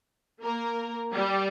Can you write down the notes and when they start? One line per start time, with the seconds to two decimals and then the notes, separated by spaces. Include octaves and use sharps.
0.43 A#3 A#4
1.13 G3 G4